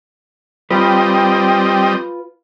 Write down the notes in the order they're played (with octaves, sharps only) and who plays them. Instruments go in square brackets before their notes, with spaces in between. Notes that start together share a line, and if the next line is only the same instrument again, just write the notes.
[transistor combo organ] G3 C4 D#5 [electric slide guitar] F4 B4